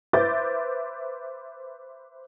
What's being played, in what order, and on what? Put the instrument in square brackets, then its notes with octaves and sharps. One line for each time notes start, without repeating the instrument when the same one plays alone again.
[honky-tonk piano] B4 C5 E5 D6 G6 A6